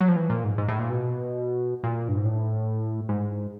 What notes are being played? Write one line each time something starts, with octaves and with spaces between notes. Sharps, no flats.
F#3
F3
E3
A#2
G#2
G#2
A2
A#2
B2
A#2
G2
G#2
A2
G#2